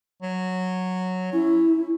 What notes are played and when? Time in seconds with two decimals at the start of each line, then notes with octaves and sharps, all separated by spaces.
0.22 F#3
1.33 C#4 E4